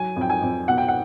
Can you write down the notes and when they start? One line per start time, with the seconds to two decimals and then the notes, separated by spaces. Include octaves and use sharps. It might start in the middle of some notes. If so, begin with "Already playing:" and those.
Already playing: F#3 G#5
0.16 F2 G5
0.29 G#5
0.42 F2
0.68 B2 F#5
0.78 G5
0.88 F#5